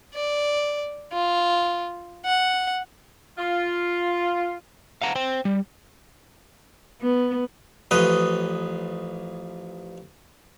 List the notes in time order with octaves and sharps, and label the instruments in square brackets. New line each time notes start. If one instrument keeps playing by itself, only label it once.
[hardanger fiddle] D5
F4
F#5
[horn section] F4
[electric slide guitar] F5 F#5 A#5
C5 G5
G3
[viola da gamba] B3
[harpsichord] A1 F3 B4 D#5